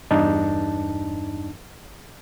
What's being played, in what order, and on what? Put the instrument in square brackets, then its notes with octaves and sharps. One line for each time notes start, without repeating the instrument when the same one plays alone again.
[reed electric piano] E2 G2 D4 D#4 A5